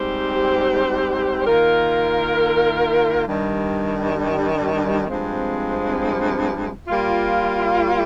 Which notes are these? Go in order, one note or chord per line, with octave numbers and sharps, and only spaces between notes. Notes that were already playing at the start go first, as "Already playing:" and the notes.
Already playing: G#2 G3 C4 G4 C5
D#3 A#3 F4 A#4
G2 D#3 G3
G2 F3 G#3 C4
G3 A#3 F4